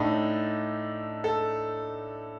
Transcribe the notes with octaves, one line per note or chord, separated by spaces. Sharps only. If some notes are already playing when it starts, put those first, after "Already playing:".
Already playing: A2 A3 D4 D#4
A4